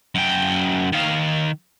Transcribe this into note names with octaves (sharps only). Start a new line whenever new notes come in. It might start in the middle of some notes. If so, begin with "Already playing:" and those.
F#2 G5
D#3 F5